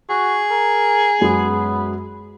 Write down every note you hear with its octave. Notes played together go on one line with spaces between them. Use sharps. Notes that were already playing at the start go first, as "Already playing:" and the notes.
F#4 G#4
A#4
F#2 G#3 B3